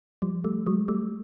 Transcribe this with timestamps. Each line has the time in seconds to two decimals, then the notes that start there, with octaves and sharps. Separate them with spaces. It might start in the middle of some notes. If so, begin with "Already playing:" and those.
0.22 F3 G3
0.44 G3 A3
0.67 F#3 G#3
0.88 G3 A3